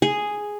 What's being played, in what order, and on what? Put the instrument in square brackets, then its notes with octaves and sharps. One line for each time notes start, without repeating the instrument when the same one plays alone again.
[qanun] G#4